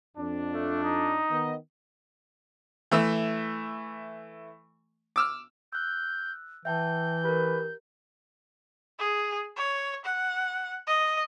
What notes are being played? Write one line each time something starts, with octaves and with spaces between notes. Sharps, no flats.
F2 D4
A3
D#4
D#3 B3 D#5
E3 A3 E6
D6 E6 F6
E6 F#6 G6
E3 E5 G5 A5 G6
G4 A#4 B4
G#4
C#5
F#5
D#5